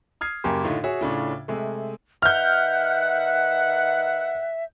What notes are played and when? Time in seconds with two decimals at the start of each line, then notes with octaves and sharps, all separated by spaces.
0.21 D#6 F6 G#6 C7
0.44 F#2 C#3 A#3 G4 C6
0.64 A2 D3 A3 D#4 F4
0.84 F#4 G#4 C#5 E5
1.01 A2 C#3 D4 F4
1.48 C3 G#3 A3
2.22 D#3 B4 E5 F#5 F6 G6